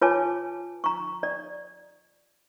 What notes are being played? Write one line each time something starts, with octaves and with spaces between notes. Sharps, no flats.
F4 B4 C#5 G#5 A5 D6
A#5 C#6
D5